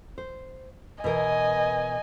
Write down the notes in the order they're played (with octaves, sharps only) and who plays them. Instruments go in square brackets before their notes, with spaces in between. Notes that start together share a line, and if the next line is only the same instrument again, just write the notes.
[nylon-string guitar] C5
[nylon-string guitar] B2 E3 A#4 [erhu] D#5 [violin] G#5